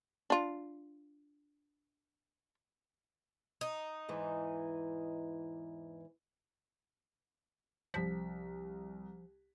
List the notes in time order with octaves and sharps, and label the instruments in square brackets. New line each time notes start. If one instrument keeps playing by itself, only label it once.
[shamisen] D4 F4
[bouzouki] D#4
[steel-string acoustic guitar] E2 G#2 E3
[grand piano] C2 B6 [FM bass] F3